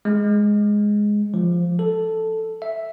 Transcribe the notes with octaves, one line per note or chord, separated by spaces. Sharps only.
G#3
F3
A4
E5